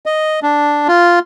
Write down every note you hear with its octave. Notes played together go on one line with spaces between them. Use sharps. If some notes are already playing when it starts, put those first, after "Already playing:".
D#5
D4
F4